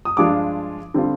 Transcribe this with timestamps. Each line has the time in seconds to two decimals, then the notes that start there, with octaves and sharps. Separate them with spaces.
0.05 D#6
0.17 G2 F3 G#3 D4 F4 D6
0.94 D3 G3 C4 F4